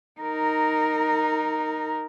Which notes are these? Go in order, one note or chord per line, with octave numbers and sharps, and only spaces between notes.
D#4 A#4